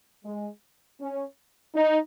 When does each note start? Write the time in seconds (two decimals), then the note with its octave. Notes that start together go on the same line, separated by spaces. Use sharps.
0.25 G#3
1.00 C#4
1.75 D#4